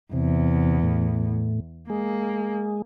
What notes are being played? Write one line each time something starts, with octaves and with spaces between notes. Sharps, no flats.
E2 C3
A2
G#3 A#3